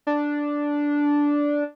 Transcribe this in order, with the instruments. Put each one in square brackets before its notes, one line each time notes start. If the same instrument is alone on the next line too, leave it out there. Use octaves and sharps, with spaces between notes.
[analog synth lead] D4